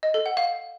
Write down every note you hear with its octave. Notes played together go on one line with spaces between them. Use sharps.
D#5
A4
F#5
F5